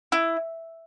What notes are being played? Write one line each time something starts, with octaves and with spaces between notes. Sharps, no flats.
E4